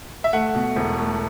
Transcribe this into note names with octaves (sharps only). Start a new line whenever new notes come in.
E5
A3 F#5
B2
E1
A3